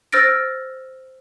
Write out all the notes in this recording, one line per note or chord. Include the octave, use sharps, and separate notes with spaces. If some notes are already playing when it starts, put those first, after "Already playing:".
C5 E6 F6 A6 A#6 D7